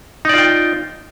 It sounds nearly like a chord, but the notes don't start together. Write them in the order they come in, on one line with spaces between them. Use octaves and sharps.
D#4 D5 F4 G5